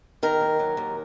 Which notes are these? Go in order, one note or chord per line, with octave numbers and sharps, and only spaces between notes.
D#3 A#4
D#2
F#3
D#2